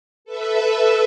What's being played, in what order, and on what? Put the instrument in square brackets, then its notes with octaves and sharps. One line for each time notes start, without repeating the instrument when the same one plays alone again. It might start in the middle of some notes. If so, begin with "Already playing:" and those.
[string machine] A4 B4 E5